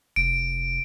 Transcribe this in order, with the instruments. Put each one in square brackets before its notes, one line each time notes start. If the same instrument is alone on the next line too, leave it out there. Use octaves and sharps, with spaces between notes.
[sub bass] F1 [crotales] D7